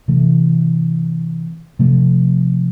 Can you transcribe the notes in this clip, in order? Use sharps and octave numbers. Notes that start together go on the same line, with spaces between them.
C3 E3 A3
C3 F3 A3